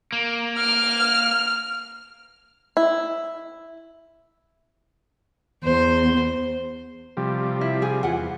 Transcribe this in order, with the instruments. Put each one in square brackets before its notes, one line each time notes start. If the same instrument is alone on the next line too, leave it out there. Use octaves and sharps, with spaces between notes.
[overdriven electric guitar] A#3
[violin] F6
[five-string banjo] E4
[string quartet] E2 [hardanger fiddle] C5
[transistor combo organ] C3 F3 G3
[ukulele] E4
G#4 G#5
[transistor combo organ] E2 [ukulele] F4 G#4 F#5